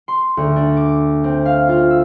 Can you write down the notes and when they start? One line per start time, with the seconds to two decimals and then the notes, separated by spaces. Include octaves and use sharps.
0.08 C6
0.37 D2
0.56 D4
0.77 D6
1.24 C4
1.46 F5
1.69 F4
1.90 E6